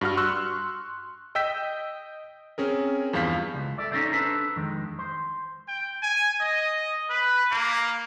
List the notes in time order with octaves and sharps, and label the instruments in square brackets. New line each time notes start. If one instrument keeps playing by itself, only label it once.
[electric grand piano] G2 F#4 F6
C6 C#6 E6 F#6
D#5 G5 E6 G6 B6
C4 C#4 G#4 A#4
E2 G2 F3 F5 G6 B6
[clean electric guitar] C#2
A4 D5 E5
C#4 D#4 A4 C5 D5
D4 A4 B4 C5 A#5
F2 D#3 G#3
C5
[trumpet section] G5
G#5
D#5
B4
A#3